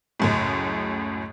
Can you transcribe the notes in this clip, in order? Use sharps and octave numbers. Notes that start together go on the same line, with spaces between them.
C#2 F#2 A2